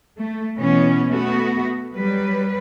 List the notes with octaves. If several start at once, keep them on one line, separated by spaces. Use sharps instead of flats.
A3
B2 E3 B3 C#4
A3 B3 F#4
F#3 G3 B4